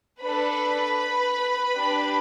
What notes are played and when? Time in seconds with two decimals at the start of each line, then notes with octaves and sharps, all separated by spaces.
0.21 D4 A4 B4 B5
1.75 D4 G4